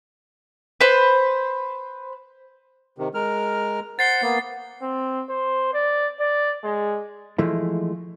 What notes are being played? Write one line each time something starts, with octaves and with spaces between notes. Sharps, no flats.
B4 C5
C3 D#3
G#3 A#4 F6
C5 F#5 A6 C7 G7
A#3 B3
C4
C5
D5
D5
G#3
E3 F3 G#3 A3 E4